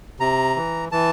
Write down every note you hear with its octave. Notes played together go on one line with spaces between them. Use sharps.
C3 A#5
E3
E3 A5